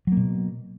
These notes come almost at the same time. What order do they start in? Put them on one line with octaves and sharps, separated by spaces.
F#3 A#3 B2